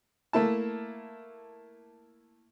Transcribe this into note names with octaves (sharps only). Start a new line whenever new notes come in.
A3 A#3 E4 A5